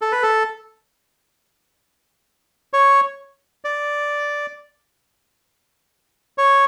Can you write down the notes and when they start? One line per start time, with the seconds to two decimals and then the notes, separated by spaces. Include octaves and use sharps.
0.01 A4
0.12 B4
0.23 A4
2.73 C#5
3.65 D5
6.38 C#5